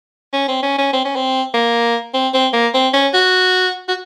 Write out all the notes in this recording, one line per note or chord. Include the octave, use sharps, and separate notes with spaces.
C#4
C4
C#4
C#4
C4
C#4
C4
A#3
C4
C4
A#3
C4
C#4
F#4
F#4